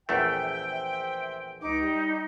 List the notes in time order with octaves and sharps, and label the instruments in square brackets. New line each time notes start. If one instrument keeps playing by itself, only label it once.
[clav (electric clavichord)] A#1 E2 A3 [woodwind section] C5 E5 G5
[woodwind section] C#2 G4 D6 [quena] D#4
[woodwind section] G3 G4